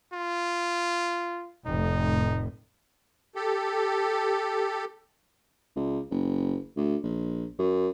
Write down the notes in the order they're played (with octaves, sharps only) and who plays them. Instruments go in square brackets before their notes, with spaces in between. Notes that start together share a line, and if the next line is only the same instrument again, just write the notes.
[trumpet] F4
[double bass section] F1 A2 [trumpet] D#4
[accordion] G4 A4
[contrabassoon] C#2
F#1
D2
A#1
F#2